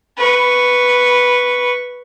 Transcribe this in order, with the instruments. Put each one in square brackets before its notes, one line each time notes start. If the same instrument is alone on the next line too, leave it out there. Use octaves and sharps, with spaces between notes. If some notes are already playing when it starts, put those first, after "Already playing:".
[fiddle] B4 C#6